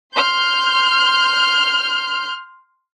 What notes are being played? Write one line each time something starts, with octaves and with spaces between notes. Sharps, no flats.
C6 F6 G6